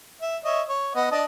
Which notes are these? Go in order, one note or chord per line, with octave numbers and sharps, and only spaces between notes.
E5
C#5 D#5 E5
C#5
B3 D#5 F#5
D4 D#5 A5